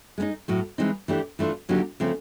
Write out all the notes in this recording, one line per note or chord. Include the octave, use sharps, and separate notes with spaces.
G#3 B3 D#4
A2 F#3 A3
E3 G#3 C4 D#4
E3 A3 D4 G4
E3 A3 D4 F4
D3 F#3 A#3 D#4 G4
C#3 F3 A3 C4